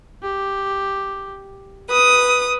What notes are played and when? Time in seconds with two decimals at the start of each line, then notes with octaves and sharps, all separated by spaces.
0.22 G4
1.89 B4 D#6